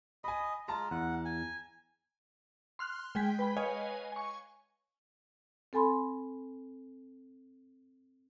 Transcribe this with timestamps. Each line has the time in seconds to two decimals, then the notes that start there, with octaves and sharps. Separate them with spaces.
0.24 D#5 G#5 B5
0.68 G#3 F4 A5 A#5
0.91 E2 F#5
1.25 G#5
2.79 C6 F6 F#6
3.15 G#3 G#4 G5 G#6 B6
3.39 B4 G5 B5
3.56 B4 C#5 D#5 F5 G#5
4.12 G#5 C#6
5.73 C4 A4 G#5 B5 C6